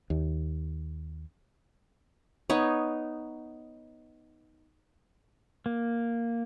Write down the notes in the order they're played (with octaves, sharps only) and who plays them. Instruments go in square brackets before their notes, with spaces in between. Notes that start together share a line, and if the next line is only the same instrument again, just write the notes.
[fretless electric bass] D#2
[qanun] B3 D#4 C#5
[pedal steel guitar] A#3